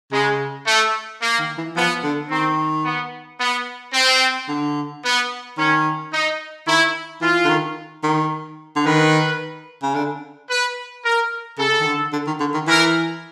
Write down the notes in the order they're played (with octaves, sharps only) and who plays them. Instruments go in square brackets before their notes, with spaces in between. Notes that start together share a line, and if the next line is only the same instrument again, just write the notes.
[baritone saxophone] C#3 [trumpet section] G#3
[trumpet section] A3
A#3
[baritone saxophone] D#3
E3
[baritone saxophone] F3 [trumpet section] B3
[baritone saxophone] D3
[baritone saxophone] D#3 [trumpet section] C4
[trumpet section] B3
B3
C4
[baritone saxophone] D3
[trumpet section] B3
[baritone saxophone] D#3 [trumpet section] C#4
[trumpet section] D#4
[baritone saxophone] D#3 [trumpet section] E4
[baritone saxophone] E3 [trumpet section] F4
[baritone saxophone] D3
D#3
D#3
D3
[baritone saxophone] D#3 [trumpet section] B4
[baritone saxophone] C#3
D3
[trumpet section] B4
A#4
[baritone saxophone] C#3 [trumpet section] A4
[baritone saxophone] D#3
D3
D3
D#3
D3
D#3
[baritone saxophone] E3 [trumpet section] A#4